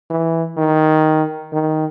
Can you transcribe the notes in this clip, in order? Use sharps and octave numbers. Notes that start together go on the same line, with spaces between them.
E3
D#3
D#3